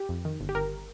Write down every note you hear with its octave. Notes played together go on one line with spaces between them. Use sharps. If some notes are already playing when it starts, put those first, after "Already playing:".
Already playing: G4
F2
D#3
G1
G4
G1 A#4